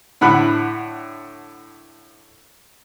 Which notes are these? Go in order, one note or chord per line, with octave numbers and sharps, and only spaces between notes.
A2 D3 F#5 B5